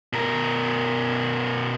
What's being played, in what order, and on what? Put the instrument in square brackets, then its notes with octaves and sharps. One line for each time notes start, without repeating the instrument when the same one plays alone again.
[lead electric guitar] B2 A#4